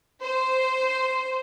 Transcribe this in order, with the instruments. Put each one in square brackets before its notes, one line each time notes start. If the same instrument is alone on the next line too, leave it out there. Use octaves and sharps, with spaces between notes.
[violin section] C5